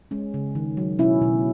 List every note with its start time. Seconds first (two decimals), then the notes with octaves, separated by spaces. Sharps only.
0.11 G#3 C#4
0.34 C#3
0.55 D#3
0.77 F#3
0.99 B2 C#4 E4
1.22 B2